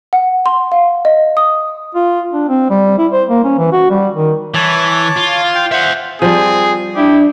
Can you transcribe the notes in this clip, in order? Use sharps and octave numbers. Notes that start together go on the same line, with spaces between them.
F#5
C6
F5
D#5
D#6
F4
D4
C4
G3
E4
C5
A#3
C#4
E3
F#4
G3
D#3
E3 C#5 A5 D6
F4
G5 C6
C5 E5 F#5
F3 G3 C4 G#4
D4 E4 G4